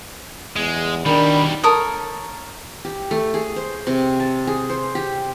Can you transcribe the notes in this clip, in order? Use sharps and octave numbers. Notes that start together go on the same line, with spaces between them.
E2 G#3
B2 D#3 G3 D4 B5
A4 A#4 C#5 D#6
G4
A3
G#4
C5
C3
A5
G#4
C5
G4